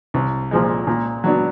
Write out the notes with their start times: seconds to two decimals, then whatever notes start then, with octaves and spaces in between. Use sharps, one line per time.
0.14 C2
0.51 A#2 F3 G#3
0.87 A#2
1.24 F#3 B3 D4